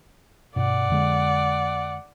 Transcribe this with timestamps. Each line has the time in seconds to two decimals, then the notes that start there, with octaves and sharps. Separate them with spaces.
0.56 G2 B2 D5 F#5
0.90 F2 D3 G#3